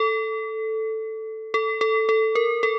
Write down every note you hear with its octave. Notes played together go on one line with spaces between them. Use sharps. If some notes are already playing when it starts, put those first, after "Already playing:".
Already playing: A4
A4
A4
A4
A#4
A4